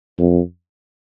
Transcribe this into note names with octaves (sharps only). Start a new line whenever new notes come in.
F2